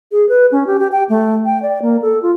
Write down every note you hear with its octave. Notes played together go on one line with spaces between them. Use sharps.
G#4
B4
C#4
G4
G4
G5
A3
G5
D5
A#3
A4
F4